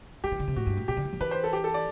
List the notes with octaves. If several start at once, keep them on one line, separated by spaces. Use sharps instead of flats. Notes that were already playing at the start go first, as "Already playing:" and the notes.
F#3 G4
E3
D3
C3
A2 F#4
G2
A2
B2 G4
D3
E3
F#3
E3 B4
C5
A4
G4
A4
D5